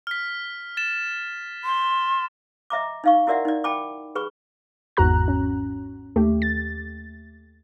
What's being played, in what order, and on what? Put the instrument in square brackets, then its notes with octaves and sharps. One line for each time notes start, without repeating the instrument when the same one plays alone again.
[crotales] F6 B6
A6 E7
[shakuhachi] C6
[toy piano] D#5 E5 A#5 D6
D#4 F5 C#6
E4 F#4 A#4 D5 E5 F#5
D#4 D5
G5 A5 B5 D6
G#4 B4 B5 C#6
[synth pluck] G#1 E2 G#2 F#4 A#5 F#6
C#4
D#2 A3 G4
A6